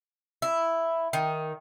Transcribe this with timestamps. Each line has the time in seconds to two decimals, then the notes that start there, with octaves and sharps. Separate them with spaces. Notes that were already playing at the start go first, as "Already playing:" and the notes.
0.42 E4
1.13 D#3